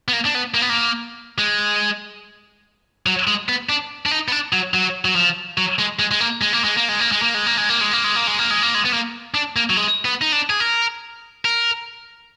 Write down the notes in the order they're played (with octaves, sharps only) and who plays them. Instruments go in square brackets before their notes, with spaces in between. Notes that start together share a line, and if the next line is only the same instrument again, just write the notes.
[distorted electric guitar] B3
A#3
D4
B3
A#3
B3
A#3
G#3
F#3
G#3
B3
D4
D4
D#4
B3
D4
F#3
F#3
F#3
F3
F#3
G#3
G#3
G#3
A#3
G#3
A#3
G#3
A#3
G#3
A#3
G#3
A#3
G#3
A#3
G#3
A#3
G#3
A#3
G#3
A#3
G#3
A#3
G#3
A#3
G#3
B3
A#3
D4
A#3
F#3
G#3
B3
D#4
D4
G#4
A#4
A#4